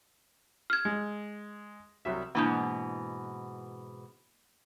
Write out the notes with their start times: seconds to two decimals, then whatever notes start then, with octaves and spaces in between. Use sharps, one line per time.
0.70 F6 G#6
0.85 G#3
2.05 C2 F#3 E5
2.35 G#2 B2 E3 A#3 D4 E4